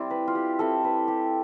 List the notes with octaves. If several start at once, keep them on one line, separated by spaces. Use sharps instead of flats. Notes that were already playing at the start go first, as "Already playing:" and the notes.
Already playing: G3 C4 E4 D5
B4
F4
G4
G3 C4 E4 A4
B4
G4